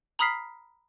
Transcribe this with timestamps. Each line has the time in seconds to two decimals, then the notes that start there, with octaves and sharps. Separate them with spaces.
0.19 A#5 B5 D#6 F6 B6 C7